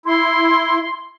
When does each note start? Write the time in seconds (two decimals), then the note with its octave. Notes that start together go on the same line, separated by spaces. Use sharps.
0.06 E4 C6